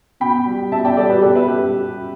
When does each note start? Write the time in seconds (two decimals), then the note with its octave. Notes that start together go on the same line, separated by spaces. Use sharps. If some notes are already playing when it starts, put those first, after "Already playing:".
0.20 B2 G5 B5
0.46 G3
0.71 B2 E5 A5
0.84 D5 G5
0.97 G3 A4 D5
1.09 G4 B4
1.22 B2 A4 D5
1.35 B4 E5
1.48 G3 G4